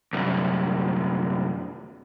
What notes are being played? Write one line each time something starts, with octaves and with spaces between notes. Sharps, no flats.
C2 F#2